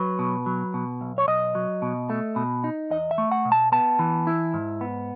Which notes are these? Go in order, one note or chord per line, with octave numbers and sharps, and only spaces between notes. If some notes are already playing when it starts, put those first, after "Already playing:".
Already playing: F#3 B4
B2
F#3
B2
B1
C#5
B1 D#5
F#3
B2
A3
B2
D#4
E2 D#5
E5
A3
F#5
B2
A5
B3 A5
E3
E4
G#2
B3